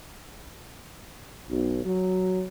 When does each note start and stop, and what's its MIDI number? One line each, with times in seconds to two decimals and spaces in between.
1.49 1.83 35
1.85 2.44 54